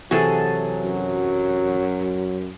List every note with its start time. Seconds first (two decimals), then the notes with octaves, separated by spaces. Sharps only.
0.11 C3 E3 F#3 F#4 G#4 A4
0.83 F#2